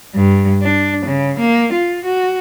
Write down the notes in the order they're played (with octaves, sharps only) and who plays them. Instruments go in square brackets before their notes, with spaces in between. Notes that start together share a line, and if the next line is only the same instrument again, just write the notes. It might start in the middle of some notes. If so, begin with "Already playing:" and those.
[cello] G2
D4
C#3
A#3
F4
F#4